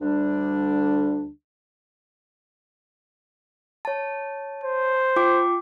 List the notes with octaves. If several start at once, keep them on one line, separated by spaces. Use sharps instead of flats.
D2 D3 G3 D4
C#5 A5
C5
F4 G5 D6